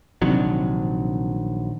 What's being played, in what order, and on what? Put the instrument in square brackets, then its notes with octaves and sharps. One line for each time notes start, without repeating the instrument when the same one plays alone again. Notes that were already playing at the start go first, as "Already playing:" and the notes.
[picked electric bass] A#1 D#3 F#3 [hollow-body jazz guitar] C3 D4